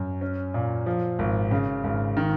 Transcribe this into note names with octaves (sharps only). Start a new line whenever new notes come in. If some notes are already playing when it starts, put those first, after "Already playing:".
Already playing: F#2
C#4
A#2
F3
G#1
C#3
G#1
D#3